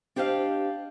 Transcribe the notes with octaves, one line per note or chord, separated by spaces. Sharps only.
D4 G4 C5 D#5 F5